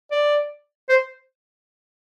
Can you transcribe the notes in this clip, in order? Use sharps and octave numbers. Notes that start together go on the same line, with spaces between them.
D5
C5